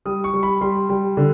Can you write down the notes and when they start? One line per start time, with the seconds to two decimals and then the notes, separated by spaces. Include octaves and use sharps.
0.05 G3 D#6
0.24 C#6
0.33 G3
0.43 B5
0.61 G3 C6
0.90 G3
1.17 D3